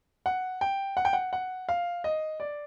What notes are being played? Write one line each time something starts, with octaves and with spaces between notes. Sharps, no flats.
F#5
G5
F#5
G5
F#5
F#5
F5
D#5
D5